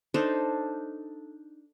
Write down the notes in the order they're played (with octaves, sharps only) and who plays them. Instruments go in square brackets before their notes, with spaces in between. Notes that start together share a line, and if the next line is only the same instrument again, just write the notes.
[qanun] D4 D#4 A4 C5